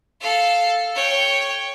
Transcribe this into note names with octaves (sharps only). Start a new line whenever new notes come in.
A4 F5
C#5 G5